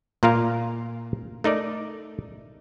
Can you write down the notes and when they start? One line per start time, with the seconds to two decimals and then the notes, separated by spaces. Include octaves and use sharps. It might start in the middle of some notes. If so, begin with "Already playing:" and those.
0.23 A#2 A#3 F4 A#4 F5
1.44 A3 D#4 A#4 D5